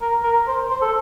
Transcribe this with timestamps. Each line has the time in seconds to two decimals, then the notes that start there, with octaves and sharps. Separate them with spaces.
0.01 A#4
0.24 A#4
0.47 C5
0.70 C5
0.81 A4